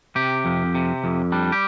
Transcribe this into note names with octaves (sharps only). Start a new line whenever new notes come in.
C3 G4
F2
C3
F2
G3 D4
G4